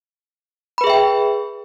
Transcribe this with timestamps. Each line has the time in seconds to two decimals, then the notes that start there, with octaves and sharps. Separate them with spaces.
0.78 B5
0.81 B4
0.84 G#4
0.87 E5
0.90 G5